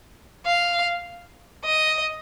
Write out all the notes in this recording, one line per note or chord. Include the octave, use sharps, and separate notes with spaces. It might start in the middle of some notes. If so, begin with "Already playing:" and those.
F5
D#5